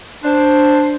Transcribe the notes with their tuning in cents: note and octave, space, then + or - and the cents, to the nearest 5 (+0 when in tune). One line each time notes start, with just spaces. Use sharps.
D4 +0 C5 +0